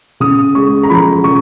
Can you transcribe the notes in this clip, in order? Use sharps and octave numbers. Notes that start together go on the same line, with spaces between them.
C#3 D#6
G#3 C#6
A#5
F3 B5
C#3 C#6